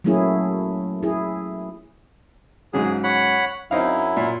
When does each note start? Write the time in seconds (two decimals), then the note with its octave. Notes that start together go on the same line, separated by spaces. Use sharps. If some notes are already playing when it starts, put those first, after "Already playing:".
0.04 F#3 A3 A#3 C#4 E4 G#4
1.03 E4 G#4
2.73 G#2 C#3 F#3 G#4
3.04 C#5 F#5 B5
3.71 F#2 F#3 C4 D#4 E4 F5
4.17 A#2